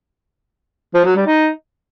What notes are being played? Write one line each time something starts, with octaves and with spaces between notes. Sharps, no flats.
F3
F#3
G3
D#4